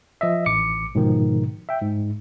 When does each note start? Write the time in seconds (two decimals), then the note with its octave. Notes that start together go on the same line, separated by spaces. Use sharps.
0.21 F3 D#5 E5
0.46 A1 D6 C#7
0.95 G#2 B2 D#3 F3
1.69 E5 G5
1.81 G#2